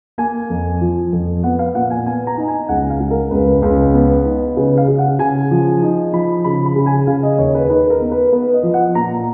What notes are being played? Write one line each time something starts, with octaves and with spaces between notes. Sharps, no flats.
A#3 G#5
F2
F3
F2
B3 F#5
F5
A#2 F#5
G#5
B3 G#5
A#5
D#4
G#5
C#2 F#5
F5
G#3
A#4
C#2 B4
C#2
B3
D#4
C#3 B4
F5
C#3
F#5
C#3 G#5
F3
D#4
F3 B5
C#3 B5
B5
C#3
G#5
C#3 F5
D#5
D#2 C#5
B4
D#4 B4
A#4
B3
B4
B3 B4
D#5
F3
F#5
A#2 A#5